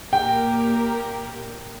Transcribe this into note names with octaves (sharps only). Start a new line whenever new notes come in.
A#2 A#3 G4 A#4 G5